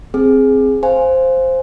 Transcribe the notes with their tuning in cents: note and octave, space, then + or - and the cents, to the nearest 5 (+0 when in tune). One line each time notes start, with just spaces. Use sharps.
C4 +10 G#4 +5
C5 +0 F5 +0 G#5 +0